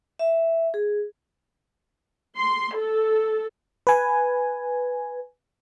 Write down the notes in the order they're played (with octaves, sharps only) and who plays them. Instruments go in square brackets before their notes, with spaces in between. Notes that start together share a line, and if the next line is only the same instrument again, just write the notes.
[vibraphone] E5
G#4
[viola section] C6
A4
[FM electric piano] B4 G#5